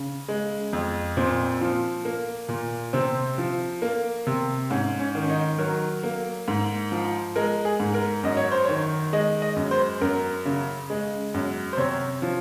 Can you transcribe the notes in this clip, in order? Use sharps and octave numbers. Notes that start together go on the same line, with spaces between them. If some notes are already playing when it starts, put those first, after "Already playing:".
Already playing: C#3
G#3
F2
A#2 C4
F3
A#3
A#2
C3 C4
F3
A#3
C3
G#2 C#4
C#4
D#3
C#4
D#4
F#3 A#4
A#3
G#2
F3
G#3 A#4
G#4
G#2
A#4
F#2 D#5
C#5
C5
D#3 C#5
G#3 D#5
D#5
F#2
C5
F#2 A#4
C#3
G#3
F#2
C5
C3 C#5
F3